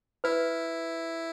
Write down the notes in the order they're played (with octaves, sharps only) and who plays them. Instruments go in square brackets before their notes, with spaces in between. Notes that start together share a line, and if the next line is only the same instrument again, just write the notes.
[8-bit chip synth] E4 [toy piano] B4